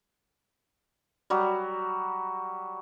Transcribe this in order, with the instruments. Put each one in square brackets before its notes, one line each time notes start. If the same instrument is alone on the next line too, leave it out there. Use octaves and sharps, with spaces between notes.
[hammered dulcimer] F#3 G3